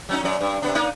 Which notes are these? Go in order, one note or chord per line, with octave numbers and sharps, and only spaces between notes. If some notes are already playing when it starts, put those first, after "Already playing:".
F#3 C#4 D#4
F#2 F#3 D5
G2
C3 B3 D4
A#3 D#4 D5